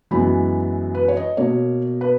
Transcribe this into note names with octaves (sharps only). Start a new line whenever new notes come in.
F#2 E3 G#3 B3 B5
B4
C#5
D#5
B2 A#3 C#5
B4